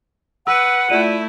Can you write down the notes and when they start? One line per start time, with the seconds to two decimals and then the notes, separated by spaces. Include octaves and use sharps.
0.47 B4 F#5 E6 D#7
0.90 A3 E4 F4 D5 D#7